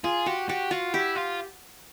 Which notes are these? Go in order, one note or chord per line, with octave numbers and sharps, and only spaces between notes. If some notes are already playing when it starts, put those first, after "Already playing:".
F4 G#4
F#4 G4
F#4 G4
F4 F#4
E4 G4
F4